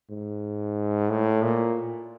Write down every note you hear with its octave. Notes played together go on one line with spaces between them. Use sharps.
G#2
A2
A#2